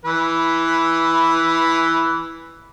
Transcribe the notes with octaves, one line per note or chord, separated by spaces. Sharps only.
E3 B4